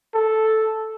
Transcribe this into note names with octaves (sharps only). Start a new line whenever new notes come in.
A4